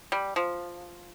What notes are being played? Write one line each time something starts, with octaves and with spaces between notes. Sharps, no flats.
G3
F3